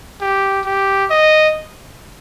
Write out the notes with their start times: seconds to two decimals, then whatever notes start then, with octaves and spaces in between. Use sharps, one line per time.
0.21 G4
0.65 G4
1.10 D#5